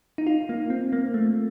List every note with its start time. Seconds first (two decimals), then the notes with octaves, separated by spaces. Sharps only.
0.18 D#4
0.27 F4
0.49 A#3
0.70 C4
0.93 A#3
1.14 A3